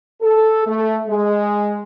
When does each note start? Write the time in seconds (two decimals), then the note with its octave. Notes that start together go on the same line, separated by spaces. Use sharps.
0.22 A4
0.67 A3
1.08 G#3